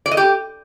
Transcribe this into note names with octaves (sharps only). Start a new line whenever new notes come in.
D5
D#5
G4